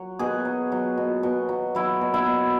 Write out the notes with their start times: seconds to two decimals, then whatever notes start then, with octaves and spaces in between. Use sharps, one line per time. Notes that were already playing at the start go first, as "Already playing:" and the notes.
Already playing: F#3
0.19 B2 G#4
0.45 F#3
0.72 F#3
0.98 B2
1.23 B2
1.49 F#3
1.75 F#3 E4
2.01 B2
2.14 E4
2.27 B2